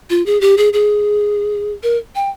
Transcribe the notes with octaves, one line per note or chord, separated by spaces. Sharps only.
F4
G#4
G4
G#4
G#4
A#4
G5